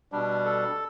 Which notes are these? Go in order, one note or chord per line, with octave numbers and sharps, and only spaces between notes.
B2 G3 D4
A4